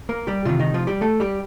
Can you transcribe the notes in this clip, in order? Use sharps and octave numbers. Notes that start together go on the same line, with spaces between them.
A#3 A#4
G3 G4
C3 D#3 F3 F4
D#3 D#4
F3 F4
G3 G4
A3 A4
G3 G4